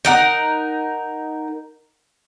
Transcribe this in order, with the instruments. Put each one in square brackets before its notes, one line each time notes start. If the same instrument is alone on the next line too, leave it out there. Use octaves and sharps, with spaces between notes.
[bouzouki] D#4 A#4 F#5